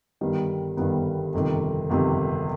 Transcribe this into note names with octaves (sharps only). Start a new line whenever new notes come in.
G1 G2 D#3 G3 B3
G1 G2 D#3 G3 B3
G1 F2 C3 D#3
G1 F2 C3 D#3